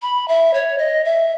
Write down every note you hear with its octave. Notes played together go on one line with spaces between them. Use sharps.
B5
E5
C#5
D#5
E5